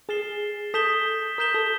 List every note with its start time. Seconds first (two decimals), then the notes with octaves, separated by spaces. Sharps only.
0.09 G#4 F6 A6 C7 E7 G7
0.74 A4 D#6 G6 B6 E7 G7
1.38 A#4 D#6 G6 B6 E7 G7
1.54 A4